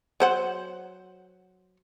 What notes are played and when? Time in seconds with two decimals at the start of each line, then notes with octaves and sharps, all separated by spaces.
0.20 F#3 C5 F#5